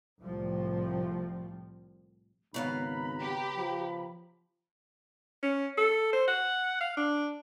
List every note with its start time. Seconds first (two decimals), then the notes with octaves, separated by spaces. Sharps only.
0.21 C2 A2 F3 C4
2.54 G#1 C#3 B3 F5 A#5 B5
3.20 G4
3.57 F3
5.43 C#4
5.78 A4
6.13 C5
6.28 F#5
6.81 F5
6.97 D4